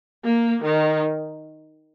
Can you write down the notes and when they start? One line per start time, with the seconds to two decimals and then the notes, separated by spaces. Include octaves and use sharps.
0.24 A#3
0.63 D#3